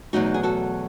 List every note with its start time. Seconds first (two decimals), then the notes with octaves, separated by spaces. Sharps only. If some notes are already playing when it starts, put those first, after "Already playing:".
0.13 E2 B2 F#3 A3 D#4 F#4
0.34 G#4
0.43 F#4 A4